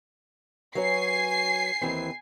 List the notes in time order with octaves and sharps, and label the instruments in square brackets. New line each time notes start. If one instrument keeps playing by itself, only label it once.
[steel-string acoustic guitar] F#3 B4 C#5 [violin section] G#5 C7
[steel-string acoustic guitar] D#2 E3 C4